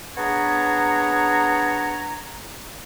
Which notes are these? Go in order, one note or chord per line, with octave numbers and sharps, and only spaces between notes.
B3 D4 G#4 C#5 A#5